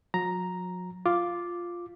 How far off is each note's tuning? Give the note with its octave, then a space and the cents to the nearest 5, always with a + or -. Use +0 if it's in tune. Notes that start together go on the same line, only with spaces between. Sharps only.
F#3 -45 A#5 +0
F4 +0 D6 +0